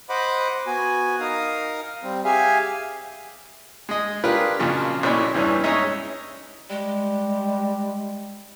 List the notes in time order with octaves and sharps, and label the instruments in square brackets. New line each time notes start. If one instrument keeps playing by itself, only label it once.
[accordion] C5 D#5 F#5 B5 D6
B3 F#4 G#5
D#4 A#4 F5 D#6
G3 C4
G4 G#4 E5 F5 G#5
[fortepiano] G#3 D#5
D4 F4 G4 G#4 A#4 B4
F2 A#2 C#3 F3 F#3
B1 A#2 C#4 E4 D5 B5
E2 G2 E3 C#4 D4
G#3 C#4 D#4 C#5 D#5 E5
[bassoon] G3 [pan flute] G#3